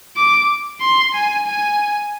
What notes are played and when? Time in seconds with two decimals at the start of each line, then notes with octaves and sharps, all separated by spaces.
0.17 D6
0.81 C6
1.14 G#5
1.46 G#5